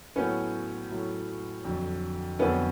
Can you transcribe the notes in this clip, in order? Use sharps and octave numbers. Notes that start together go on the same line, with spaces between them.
A2 F#3 A3 B3 C#4
A2 F#3 A3
F2 D3 F#3
F2 D3 F#3 B3 C#4